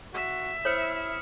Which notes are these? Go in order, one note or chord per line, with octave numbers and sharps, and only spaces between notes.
F#4 E5
E4 C5 C#5 D#6 F6 C#7